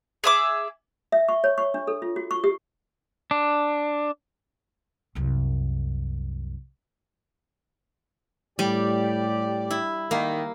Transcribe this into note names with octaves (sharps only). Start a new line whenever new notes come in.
G#4 E5 D6
E5
C#6
C#5
C#6
D4
A4
F4
F#4
C#6
G4
D4
C2 F#2
A2 G3 G4 D5
E4
D#3 A#3